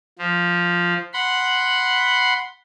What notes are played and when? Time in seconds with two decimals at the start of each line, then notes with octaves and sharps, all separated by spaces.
0.19 F3
1.13 F#5 B5 C6